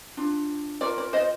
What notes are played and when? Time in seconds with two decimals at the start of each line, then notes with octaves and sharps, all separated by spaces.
0.17 D4 F4
0.81 F4 A#4 D5
0.98 D5
1.13 C5 D#5